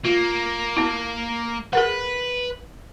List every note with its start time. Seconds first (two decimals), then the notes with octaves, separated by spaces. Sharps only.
0.05 A#3 F4
0.77 B3 E4
1.73 G#4 A#4 B4 F#5 B5